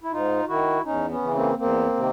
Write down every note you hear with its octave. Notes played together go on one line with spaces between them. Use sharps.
E4
G#2 D#4 F4
D#3 E4 F#4
E2 C#4 D#4
B3 C#4
C#3 E3
A#3 C4
E2 A#3 C4
C3 D#3